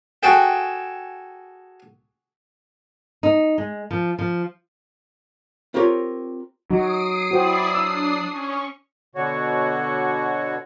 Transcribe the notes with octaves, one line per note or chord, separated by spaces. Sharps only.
F#4 G#4 A4 G5
D#4
G#3
F3
F3
C4 F4 G4 A#4 C#5
F#3 D#4 F#4 D#6 C7 D7
E4 F#4 C5 D5 G5
D4 E6
C#4 C#6
B2 D3 F#4 C#5